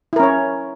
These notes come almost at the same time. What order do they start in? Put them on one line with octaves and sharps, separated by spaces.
E4 A#4 C#4 C#5